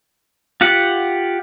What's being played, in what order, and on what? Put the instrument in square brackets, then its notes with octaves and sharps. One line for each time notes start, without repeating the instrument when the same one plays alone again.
[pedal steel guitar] F4 G4 F#5